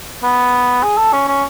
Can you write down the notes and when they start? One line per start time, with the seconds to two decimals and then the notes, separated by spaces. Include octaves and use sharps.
0.23 B3
0.83 G#4
0.98 A4
1.13 C#4
1.28 C#4